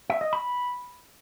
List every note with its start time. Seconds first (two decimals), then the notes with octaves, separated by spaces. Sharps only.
0.10 E5
0.21 D#5
0.33 B5